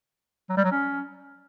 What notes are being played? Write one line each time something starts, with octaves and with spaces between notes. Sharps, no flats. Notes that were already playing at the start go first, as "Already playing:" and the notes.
F#3
G3
F#3
C#4